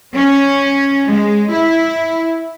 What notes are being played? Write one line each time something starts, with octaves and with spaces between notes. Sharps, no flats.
C#4
G#3
E4